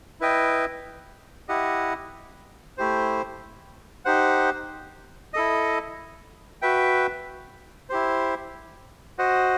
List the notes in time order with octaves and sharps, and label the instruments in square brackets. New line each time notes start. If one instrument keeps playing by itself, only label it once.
[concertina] E4 B4 D#5 G5
E4 G4 D#5 F#5
A3 E4 G4 C5
D#4 G4 C5 F#5
E4 A4 D#5
F#4 B4 E5 G5
E4 G4 C5
F#4 C5 D#5 F#5